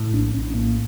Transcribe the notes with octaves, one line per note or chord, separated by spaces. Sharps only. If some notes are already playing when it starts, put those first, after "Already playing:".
Already playing: A2
A#1 D4
A#1 C#4
A2 A#3